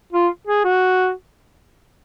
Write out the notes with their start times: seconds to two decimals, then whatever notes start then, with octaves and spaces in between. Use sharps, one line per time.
0.12 F4
0.47 G#4
0.64 F#4